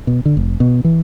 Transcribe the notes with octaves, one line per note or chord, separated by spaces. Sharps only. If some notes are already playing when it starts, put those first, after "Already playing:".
B2
D3
F1
B2
E3